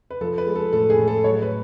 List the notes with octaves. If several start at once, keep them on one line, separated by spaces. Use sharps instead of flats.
B4
F3 A4
B4
G#3
A4
A2 A4
G#4
A2
A4
F#3 C#5
B4